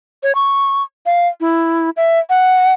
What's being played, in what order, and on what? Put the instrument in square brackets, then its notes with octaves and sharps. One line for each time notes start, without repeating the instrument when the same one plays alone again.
[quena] C#5
C#6
F5
E4
E5
F#5